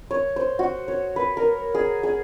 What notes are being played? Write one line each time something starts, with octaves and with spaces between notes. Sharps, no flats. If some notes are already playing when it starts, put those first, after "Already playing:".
C#5
C5
F#4
C#5
B4
A#4
G#4
G#4